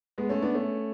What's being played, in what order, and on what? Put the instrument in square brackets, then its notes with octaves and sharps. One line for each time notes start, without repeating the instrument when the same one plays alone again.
[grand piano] G#3 B3
A3 C#4
B3 D4
A3 C#4